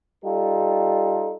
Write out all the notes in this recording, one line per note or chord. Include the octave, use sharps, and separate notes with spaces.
G3 D#4 F4 A4